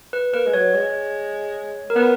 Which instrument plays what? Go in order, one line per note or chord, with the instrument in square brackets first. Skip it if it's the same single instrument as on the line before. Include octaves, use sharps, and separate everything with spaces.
[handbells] B4
[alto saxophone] A#3 [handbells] B4
[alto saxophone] G#3
[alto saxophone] F#3 [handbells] C#5
[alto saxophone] G#3
[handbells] A#4
[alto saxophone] B3 [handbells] B4